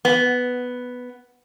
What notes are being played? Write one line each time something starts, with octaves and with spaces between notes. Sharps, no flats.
B3